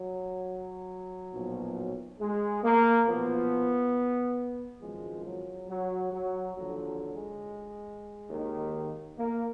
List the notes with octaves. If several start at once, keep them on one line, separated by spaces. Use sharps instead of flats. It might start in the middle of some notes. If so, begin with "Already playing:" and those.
Already playing: F#3
B1 A#2 F3
G#3
A#3
B1 A#2 F3 B3
G#1 F#2 F3 G#3
F#3
F#3
F#3
D#2 D3 F3 F#3
F#3
G#3
D#2 D#3
A#3